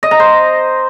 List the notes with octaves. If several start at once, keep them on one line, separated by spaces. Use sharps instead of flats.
D#5
A#5
C5